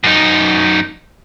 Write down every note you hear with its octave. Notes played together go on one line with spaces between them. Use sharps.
F#2 D#4